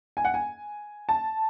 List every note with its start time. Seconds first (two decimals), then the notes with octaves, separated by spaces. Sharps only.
0.17 G#5
0.25 F#5
0.34 G#5
1.09 A5